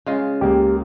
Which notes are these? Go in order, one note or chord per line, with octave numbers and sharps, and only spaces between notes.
C#3 G#3 F4
C#2 A#3 G4